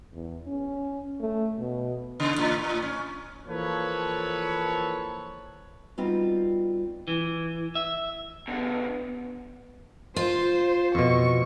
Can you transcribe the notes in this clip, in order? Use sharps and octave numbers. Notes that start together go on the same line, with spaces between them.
E2
C#4
A3
B2
C#3
A2
A2
C#4
E3 F3 A#3 A4 B4 C#5
G3 B3 C4 D#4 F4 F#4
E3
E5
B2 D3 B3
F4 C5
F2 B2 C#6